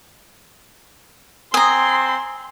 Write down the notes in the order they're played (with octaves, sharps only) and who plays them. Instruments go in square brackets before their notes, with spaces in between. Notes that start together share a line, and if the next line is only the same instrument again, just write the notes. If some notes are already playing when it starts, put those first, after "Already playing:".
[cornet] C4 [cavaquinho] G#5 A#5 [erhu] C6 [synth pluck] D#6